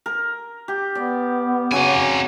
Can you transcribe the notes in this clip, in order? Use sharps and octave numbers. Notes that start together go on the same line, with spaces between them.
A#4
G4
B3 D5
C#3 F#3 C4 G#5 D6